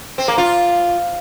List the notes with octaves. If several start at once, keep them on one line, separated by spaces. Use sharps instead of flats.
C4
A#3
F4